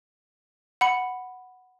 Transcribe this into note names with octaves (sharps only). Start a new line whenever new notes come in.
F#5 B5 C#7